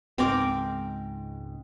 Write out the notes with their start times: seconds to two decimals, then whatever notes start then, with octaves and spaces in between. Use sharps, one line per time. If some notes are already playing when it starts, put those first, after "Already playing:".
0.18 C#2 G#2 C4 A#4 D6